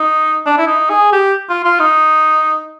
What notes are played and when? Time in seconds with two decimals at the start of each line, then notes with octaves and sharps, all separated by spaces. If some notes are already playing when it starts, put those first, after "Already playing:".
Already playing: D#4
0.46 D4
0.58 E4
0.67 D#4
0.90 G#4
1.13 G4
1.49 F4
1.64 F4
1.79 D#4